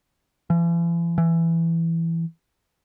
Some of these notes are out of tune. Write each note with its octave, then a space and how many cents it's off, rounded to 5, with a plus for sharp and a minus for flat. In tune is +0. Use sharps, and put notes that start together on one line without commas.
E3 +40
E3 +10